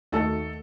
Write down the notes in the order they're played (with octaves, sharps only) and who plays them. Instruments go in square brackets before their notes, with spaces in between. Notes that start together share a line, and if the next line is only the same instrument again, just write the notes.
[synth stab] D#2 D#3 A3 D#4 F#4 [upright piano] A4